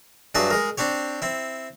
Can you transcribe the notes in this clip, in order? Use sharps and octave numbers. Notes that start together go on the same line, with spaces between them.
G2 F#3 G#4 E5 A5
G#3 G#4 A#4
C4 D4 G4 C#5
C4 E4